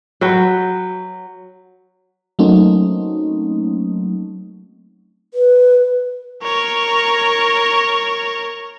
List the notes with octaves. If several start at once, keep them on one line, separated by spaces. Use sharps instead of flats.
F#3 B4 G5
F#3 A3 A#3 C4 C#4 D#4
B4
A#4 C#5